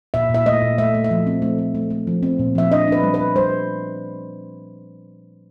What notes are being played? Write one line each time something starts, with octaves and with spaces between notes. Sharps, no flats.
A#2 E5
A#2 E5
A3 D#5
A#2
A3 E5
A3
E5
F3
C4
A3
A3
A3
A3
F3
C4
A#2
F3 E5
D4 D#5
D4 B4
G3
B4
G3
G3 C5